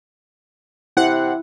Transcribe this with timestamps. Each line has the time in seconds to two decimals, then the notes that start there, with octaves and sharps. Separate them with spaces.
0.97 C3 E4 F#5